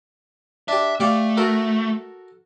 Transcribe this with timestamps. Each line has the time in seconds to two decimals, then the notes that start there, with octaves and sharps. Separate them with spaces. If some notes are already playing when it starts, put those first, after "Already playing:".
0.68 D4 G4 E5
1.00 A3 G4 D5 F5
1.37 F#4 A4 A#4